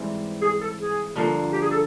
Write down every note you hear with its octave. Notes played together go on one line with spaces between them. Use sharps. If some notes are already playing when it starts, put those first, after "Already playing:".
Already playing: G#2 E3 G3 C4
G#4
A4
G#4
G2 D3 F3 A#3
G4
G#4
A4